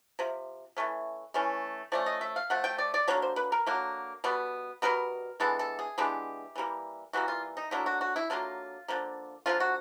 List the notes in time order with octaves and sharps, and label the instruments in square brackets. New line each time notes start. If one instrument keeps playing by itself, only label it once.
[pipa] C3 F3
E3 A3 C#4
E3 A3 C#4
F3 A3 C#4 D5
D#5
E5
F5
F3 A3 F#5
G5
D5
D5
D3 F#3 A#3 C#5
C5
B4
A#4
D3 F#3 A#3
B2 G3 B3
B2 G3 B3 A#4
E3 G#3 B3 D4 A4
A4
G#4
E3 G#3 B3 D4 G4
E3 G3 A#3
E3 G3 A#3 F#4
F4
D#4
D3 F#3 A#3 E4
F#4
F#4
E4
D3 F#3 A#3 F4
D3 F3 A#3
D3 F3 A#3 F4
F#4